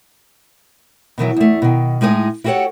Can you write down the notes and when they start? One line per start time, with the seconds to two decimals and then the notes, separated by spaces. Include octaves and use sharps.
1.18 B2 D#3 E3 F#3
1.36 E2 A3
1.62 B2 D#3
2.01 A2 G#3 D#4 C5 G#5
2.44 E4 F#4 G4 A4 C#5 F#5